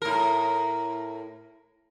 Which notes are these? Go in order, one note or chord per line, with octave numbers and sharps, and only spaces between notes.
A2 A#4